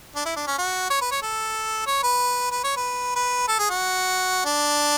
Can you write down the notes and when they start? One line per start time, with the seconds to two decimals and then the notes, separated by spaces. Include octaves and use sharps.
0.16 D4
0.26 E4
0.36 D4
0.47 C#4
0.58 F#4
0.90 C#5
1.01 B4
1.12 C#5
1.22 A4
1.87 C#5
2.03 B4
2.52 B4
2.64 C#5
2.77 B4
3.16 B4
3.48 A4
3.59 G#4
3.70 F#4
4.45 D4